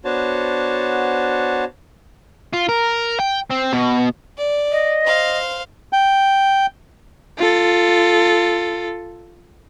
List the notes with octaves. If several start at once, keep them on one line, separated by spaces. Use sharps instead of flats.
B3 D4 F#4 C5 C#5 A5
F4
A#4
G5
C4
B2
D5
D#5
C5 F5
G5
F4 A4